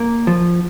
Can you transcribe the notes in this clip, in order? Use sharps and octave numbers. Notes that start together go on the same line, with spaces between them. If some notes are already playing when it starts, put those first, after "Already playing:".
Already playing: A#3
F3